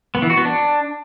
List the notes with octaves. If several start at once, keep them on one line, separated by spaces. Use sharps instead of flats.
B3
E3
F#4
B3
D4